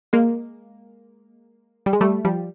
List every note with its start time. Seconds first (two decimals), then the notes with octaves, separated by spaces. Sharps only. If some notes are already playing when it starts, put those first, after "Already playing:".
0.13 G#3 A#3
1.86 G3
1.93 G#3
2.01 G3 A3
2.25 F3 G3